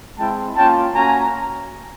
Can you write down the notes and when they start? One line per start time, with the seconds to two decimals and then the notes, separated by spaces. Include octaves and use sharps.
0.18 G#3 C4 E4 G5 A5
0.56 A#3 C#4 F4 G5 A5
0.94 A#3 C#4 F#4 G#5 A#5